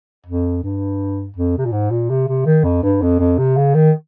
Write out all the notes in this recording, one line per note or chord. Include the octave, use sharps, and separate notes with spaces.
F2
G2
F2
C3
A#2
G#2
A#2
C3
C3
D#3
F2
G2
F2
F2
C3
C#3
D#3